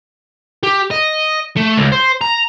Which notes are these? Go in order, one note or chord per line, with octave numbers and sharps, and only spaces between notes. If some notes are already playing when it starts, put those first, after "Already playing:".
G4
D#5
A3
C#2
C5
A#5